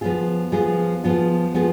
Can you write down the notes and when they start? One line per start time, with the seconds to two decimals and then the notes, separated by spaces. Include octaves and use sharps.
0.01 F3 B3 F4 G#4
0.52 F3 B3 F4 G#4
1.03 F3 B3 F4 G#4
1.55 F3 B3 F4 G#4